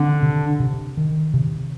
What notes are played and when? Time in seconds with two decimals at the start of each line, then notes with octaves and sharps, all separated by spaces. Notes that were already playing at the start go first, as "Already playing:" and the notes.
Already playing: D3 D#3 C4
0.22 C3
0.60 C3
0.97 D#3
1.34 C3